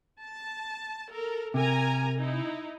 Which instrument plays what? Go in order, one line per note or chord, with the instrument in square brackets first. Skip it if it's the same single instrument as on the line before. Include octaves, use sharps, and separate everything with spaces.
[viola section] A5
A4 A#4
[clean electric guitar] C3 [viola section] A#4 G#5 A#5
[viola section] D#4 E4